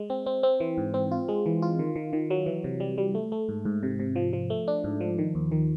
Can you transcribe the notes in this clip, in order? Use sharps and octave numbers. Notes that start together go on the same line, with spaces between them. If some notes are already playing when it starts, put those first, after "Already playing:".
Already playing: G#3
C4
C4
C4
E3
G#2
C4
F4
G#3
E3
F4
D#3
D#3
D#3
F#3
E3
C3
G3
G3
A3
A3
G#2
G#2
C3
C3
F3
F3
A3
D4
G#2
F3
D#3
D#2
D#3